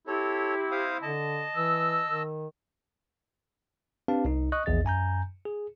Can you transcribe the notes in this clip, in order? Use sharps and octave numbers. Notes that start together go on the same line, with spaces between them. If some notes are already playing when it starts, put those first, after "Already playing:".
C4 E4 G4 A4 C#5
C5 F5 D#6
D3 D#5 A5
E3 E6
D#3
C4 D4 G4 B4 F5 A5
C2 D#4
D#5 C#6 D#6 F#6
A#1 E2 G#4 D#5 A6
F#2 G#5 A#5 G6
G#4